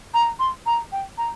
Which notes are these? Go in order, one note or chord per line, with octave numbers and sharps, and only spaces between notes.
A#5
C6
A#5
G5
A#5